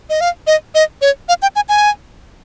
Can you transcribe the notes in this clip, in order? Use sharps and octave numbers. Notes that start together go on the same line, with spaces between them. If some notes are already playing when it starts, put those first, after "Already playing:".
D#5
F5
D#5
D#5
C#5
F5
G5
G#5
G#5